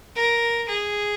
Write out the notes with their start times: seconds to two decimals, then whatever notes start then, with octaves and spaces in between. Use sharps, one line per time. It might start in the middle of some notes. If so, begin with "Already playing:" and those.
0.16 A#4
0.68 G#4